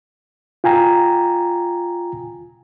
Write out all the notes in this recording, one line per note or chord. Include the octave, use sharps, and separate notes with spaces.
F4 G5 G#5 A#5